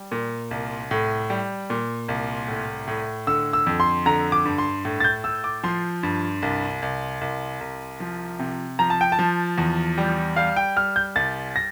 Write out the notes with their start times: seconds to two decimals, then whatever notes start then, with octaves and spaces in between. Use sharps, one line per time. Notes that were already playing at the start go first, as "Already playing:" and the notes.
Already playing: G3
0.12 A#2
0.51 C2
0.91 A2
1.30 G3
1.70 A#2
2.08 C2
2.48 A2
2.88 A2
3.27 D3 E6
3.53 E6
3.67 F2
3.80 C6
4.06 D3 A#5
4.32 D6
4.45 G2
4.58 C6
4.85 A2
5.00 A6
5.04 G6
5.24 A2 E6
5.44 D6
5.64 F3 C6
6.03 G2
6.42 C2
6.82 C2
7.21 C2
7.61 C2
8.00 F3
8.39 C3
8.79 F3 A#5
8.90 A5
9.01 G5
9.12 A5
9.19 F3
9.58 E2
9.98 G3
10.36 G3 F5
10.56 G5
10.76 G3 F6
10.96 G6
11.15 C2 A6
11.56 A#6